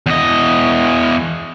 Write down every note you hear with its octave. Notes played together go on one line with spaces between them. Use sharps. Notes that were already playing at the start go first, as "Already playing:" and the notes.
E2 D#5